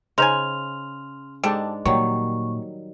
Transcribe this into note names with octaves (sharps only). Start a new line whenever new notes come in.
C#3 D#4 C5 G#5 C6 F6 F7
G#2 G#3 D4 G4 A4
A#2 D#3 F#3 G3 C#5 C#6